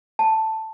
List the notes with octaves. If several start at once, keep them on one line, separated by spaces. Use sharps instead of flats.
A5